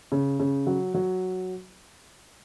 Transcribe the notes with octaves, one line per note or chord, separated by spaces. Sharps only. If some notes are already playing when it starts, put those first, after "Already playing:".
C#3
C#3
F#3
F#3